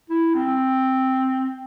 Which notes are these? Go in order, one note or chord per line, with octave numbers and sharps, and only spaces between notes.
E4
C4